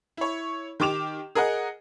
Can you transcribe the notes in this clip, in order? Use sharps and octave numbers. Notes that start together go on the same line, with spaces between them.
E4 C#5
D#3 G4 D6 E7 F7
G#4 A#4 D#5 F#5